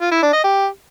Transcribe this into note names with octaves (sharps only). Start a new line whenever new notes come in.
F4
E4
D4
D#5
G4